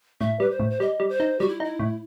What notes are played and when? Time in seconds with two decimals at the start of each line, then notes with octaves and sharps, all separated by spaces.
0.21 A2 E5
0.40 G3 B4
0.50 C5
0.60 A2
0.70 C5
0.80 G3 D#5
1.00 G3
1.09 C5
1.20 D#4
1.39 G3 F#4
1.49 E4
1.60 D#4 E4
1.79 A2